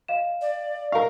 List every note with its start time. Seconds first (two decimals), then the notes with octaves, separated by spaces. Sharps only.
0.08 D#5 F5 E7
0.41 D5
0.92 A#4 F5 C#6